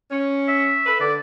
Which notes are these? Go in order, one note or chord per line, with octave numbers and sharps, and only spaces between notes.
C#4
E5
A4 B4
D3 D5